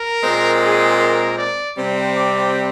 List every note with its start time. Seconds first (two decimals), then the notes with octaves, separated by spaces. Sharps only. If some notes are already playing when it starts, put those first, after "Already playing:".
Already playing: A#4
0.23 A#2 G#3 C4
0.61 G#4
1.00 A#4
1.38 D5
1.76 C3 G3 C4
2.14 D5